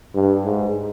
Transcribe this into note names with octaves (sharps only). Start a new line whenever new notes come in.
G2
G#2